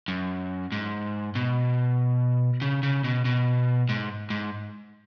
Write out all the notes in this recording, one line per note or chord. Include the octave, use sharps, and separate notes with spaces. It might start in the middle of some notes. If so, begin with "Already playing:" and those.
F#2
G#2
B2
C#3
C#3
B2
B2
G#2
G#2